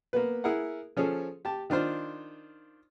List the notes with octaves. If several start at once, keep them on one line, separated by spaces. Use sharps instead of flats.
A#3 B3 B4
E4 G#4 A#4 F#5
F3 C#4 G#4 A4
G4 A5
D#3 D4 F4 C5